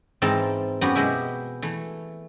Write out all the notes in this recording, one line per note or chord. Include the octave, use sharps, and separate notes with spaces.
G#2 E3 C4 A5 A#5
F#2 B3 F#4 G4
B2 G#3 E4 G4
E3 A3